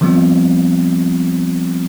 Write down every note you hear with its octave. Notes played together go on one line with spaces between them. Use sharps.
D#3 F3 G3 B3 C4 F4